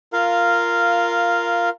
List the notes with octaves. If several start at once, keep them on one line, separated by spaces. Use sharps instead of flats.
F4 A#4 F5